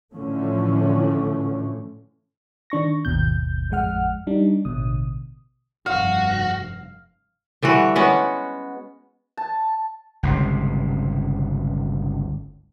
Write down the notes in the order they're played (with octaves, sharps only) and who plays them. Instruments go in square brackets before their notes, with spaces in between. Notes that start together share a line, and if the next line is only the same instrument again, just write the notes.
[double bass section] A2 D3 E3 F3 A3 C#4
[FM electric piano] D#3 D4 C#6 A#6
G#1 D#2 B2 G6
A1 F2 G#3 F#5 F6
G3 D4 D#4
A1 B2 D3 D#6
[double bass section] F1 G2 [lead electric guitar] F#4 [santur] F5
[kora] D3 E3 G3 F#4
G#3 B3 C#4 F#4
[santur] A5
[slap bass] G1 C#2 C3